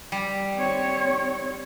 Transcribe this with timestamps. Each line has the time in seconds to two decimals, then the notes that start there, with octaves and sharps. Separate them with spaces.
0.12 G3
0.55 C4 C#5